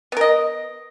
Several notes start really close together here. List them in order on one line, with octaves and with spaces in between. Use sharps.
B3 A#4 D#5